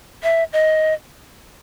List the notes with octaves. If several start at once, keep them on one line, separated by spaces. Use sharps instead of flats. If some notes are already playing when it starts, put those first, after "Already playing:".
E5
D#5